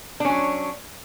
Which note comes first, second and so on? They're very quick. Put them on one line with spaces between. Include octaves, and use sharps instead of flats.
D4 C#4 F#3